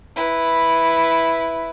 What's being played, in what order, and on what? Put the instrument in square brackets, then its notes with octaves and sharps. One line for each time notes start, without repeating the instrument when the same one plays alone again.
[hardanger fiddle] E4 B4